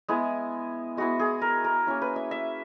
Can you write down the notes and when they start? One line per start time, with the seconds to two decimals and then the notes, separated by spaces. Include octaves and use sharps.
0.08 G#3 B3 E4 G#4
0.97 G#3 B3 E4 F#4
1.19 G#4
1.42 A#4
1.64 A#4
1.87 A#3 C#4 E4
2.02 B4
2.16 E5
2.31 E5